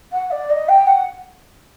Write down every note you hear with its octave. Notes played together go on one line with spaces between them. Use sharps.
F#5
D5
D#5
G5
F#5